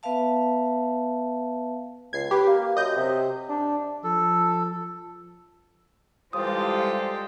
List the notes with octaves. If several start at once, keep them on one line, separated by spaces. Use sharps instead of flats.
B3 B4 E5 F5 A5
C#2 G#6 C7
G4 B4
A#3
F#2 D#5 G6
C3
D4
F3 A4
E3 G3 G#3 F4 G4 A4 C5 D#6